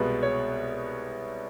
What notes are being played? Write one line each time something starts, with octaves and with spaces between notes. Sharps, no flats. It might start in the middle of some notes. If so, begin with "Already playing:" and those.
Already playing: C2 B2 G#3 B4
C#5